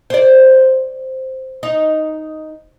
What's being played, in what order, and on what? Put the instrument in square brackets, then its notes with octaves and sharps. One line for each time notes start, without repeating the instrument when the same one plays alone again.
[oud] C5 D5
D#4